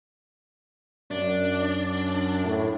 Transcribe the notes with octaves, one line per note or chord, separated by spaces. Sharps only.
F#2 D4
A2